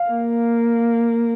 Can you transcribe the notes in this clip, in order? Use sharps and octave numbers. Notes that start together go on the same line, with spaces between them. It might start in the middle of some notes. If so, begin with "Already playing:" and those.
Already playing: F5
A#3